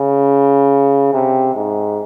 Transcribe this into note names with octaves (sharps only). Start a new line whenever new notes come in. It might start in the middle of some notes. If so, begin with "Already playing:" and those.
Already playing: C#3
C3
G#2